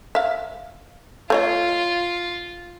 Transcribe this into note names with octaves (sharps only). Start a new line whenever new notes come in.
E5 F5
A3 F4 C#5 D#5